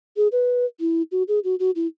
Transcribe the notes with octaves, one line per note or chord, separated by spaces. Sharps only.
G#4
B4
E4
F#4
G#4
F#4
F#4
E4